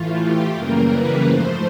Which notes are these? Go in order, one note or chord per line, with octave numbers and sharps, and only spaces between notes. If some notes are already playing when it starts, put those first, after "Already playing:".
Already playing: A2 E3 A3 F4
G4
F#2 C#3 E3 G3 A#3 A#4
B4
G#2 F3 A3 C5